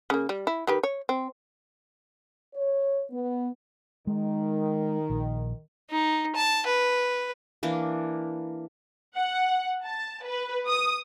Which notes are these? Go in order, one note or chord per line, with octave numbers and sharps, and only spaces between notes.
C#3 A#3
G3
E4
D#3 G4 B4
C#5
C4
C#5
B3
D#3 G#3
A#1
D#4
A5
B4
E3 A#3 D4
F#5
A5
B4
D#6